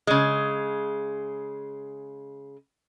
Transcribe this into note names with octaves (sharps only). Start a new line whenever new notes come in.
C#3 G#3